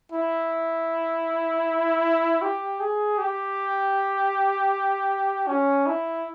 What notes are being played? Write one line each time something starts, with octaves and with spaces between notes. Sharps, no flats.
E4
G4
G#4
G4
C#4
E4